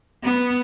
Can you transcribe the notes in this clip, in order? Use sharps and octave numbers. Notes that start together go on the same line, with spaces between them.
B3